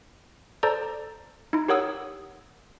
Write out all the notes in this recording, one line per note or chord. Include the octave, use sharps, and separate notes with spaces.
A4 C5 D5 A5 A#5
D#4 E4
G4 A#4 C#5 F#5 D#6 E6